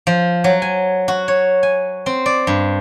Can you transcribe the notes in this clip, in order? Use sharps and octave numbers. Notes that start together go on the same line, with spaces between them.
F3
F#3
G#5
F#4
C#5
G#5
C4
D5
G2